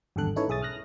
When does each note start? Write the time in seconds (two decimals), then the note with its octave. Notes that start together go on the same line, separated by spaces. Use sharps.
0.16 G#1 E2 G2 D3 A4 F#6
0.36 C#4 D#4 E4 A4 B4 C#5
0.48 B1 G#4 E5 D#6 A6
0.62 D#6 F6 F#6 A#6